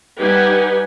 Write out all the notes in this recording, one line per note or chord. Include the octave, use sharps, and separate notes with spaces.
G3 D#4 G4 B4 F#5 G#5